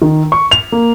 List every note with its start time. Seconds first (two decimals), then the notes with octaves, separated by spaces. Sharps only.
0.02 D#3
0.32 C#6
0.51 F7
0.72 A#3